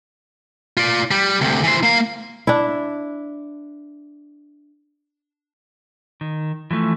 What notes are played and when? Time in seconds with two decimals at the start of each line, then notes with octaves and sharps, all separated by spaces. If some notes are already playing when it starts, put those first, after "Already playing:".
0.77 F4 D5
1.11 G3
1.41 D2 C3
1.63 E3 C5
1.83 A#3 F5
2.47 D4 E4
6.21 D#3
6.71 E3 F3 A3